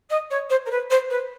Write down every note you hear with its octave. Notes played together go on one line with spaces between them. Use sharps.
D#5
C#5
C5
A#4
B4
C5
B4